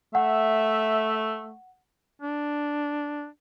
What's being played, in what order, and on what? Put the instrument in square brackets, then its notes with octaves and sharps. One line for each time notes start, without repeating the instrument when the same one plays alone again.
[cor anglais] A3 [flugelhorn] E5 [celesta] F#5
[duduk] D4